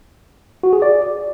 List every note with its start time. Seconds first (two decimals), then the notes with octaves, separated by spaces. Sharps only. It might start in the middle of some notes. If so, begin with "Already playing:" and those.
0.63 F#4
0.73 G#4
0.82 D5